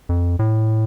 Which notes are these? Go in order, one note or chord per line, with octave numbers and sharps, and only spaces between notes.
F2
A2